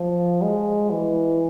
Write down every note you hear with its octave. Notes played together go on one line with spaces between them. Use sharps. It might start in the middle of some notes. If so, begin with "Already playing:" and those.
Already playing: F3
G#3
E3